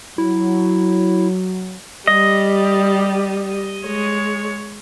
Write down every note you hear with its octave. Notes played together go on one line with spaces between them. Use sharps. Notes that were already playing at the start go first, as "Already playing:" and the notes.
F#3 E4
G3 G4 D#5
G#3 C#5